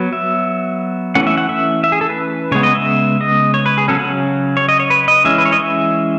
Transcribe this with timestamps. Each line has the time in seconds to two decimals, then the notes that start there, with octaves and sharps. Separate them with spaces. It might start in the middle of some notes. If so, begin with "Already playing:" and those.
Already playing: F#3 B3
0.13 E5
1.15 E3 A3 C#4 F#5
1.27 E5
1.38 F#5
1.49 E5
1.84 E5
1.92 G#4
2.01 A4
2.09 B4
2.52 C#3 G#3 B3 C#5
2.63 D#5
2.75 E5
3.21 D#5
3.54 C#5
3.66 B4
3.78 G#4
3.88 C#3 F#3 C#4 A4
3.99 F#5
4.57 C#5
4.69 D#5
4.80 C#5
4.90 B4
5.08 D#5
5.25 E3 G#3 C#4 E5
5.38 B4
5.46 C#5
5.52 D#5
5.60 E5